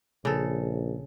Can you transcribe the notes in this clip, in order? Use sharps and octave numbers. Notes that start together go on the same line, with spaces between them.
A#1 C#3 A4